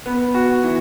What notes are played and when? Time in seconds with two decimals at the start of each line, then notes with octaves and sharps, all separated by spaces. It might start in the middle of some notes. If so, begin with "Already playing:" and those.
0.06 B3
0.34 F#4
0.64 E3